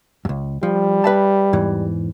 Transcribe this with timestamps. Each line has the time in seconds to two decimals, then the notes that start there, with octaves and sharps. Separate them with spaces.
0.25 C#2 F#2
0.63 F3 G3
1.04 B4 E5 A5
1.53 E2 G#2 E3